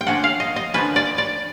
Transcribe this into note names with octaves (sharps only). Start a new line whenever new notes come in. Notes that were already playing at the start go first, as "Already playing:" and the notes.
G5
D3 F3 A#3 C#4 F#5
F5
D#5
D#5
D3 F3 A#3 C#4 B4
D5
D5